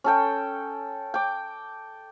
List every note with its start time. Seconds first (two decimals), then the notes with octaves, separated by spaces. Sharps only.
0.04 C#4 A4 G5
1.14 G5 D6